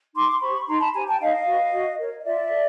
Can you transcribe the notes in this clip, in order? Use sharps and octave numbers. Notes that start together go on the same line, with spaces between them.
D#4 C6 D6
C6
G4 C5 B5 C#6
C#6
D#4 A#5 C6
A5 B5
G4 C5 G#5 A#5
G5 A5
D#4 D#5 F5
F#4 B4
F#4
A#4 C#5
D#5
F4 D5 E5
A4